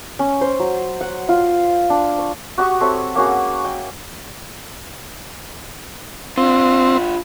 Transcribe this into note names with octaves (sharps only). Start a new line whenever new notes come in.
C#4
C5
F#3
F#5
F4
D4
C#6
F#4 G4 C#6 D#6
C4 A4 C#5 E5
A#3 C#4 F#4 G#4
G5
C4 D4 F4